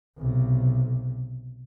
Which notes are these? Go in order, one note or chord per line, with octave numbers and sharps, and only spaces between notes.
B1 C3